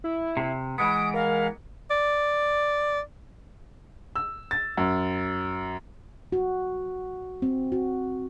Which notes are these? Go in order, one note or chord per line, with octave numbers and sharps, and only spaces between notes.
E4
C3
E3 G#3 B3 D#6 D7
A#4 F5
D5
E6
A6
F#2
F#4
C4
F#4